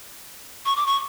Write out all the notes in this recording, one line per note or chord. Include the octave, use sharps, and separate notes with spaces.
C#6
D6
C#6